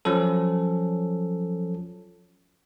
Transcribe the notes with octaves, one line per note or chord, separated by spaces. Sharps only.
F3 F#3 C#4 A4